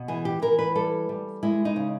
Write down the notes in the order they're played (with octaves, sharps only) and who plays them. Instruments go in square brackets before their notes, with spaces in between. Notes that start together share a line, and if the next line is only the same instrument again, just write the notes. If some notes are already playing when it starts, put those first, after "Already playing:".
Already playing: [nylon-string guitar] B2
E3 G#4
G4
E3 A#4
B4
G3 A4
G3
G#3 E4
D#4
C#3